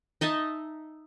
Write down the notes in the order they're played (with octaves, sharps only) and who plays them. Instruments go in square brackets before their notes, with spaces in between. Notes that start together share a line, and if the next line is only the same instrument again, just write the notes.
[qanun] D#4 D#5 E5 A5